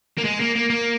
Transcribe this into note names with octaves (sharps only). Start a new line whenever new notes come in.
A#3
G#3
A#3
A#3
A#3